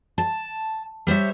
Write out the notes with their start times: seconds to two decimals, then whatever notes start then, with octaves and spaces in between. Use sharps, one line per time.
0.18 A5
1.07 G3 C5 C#5 E5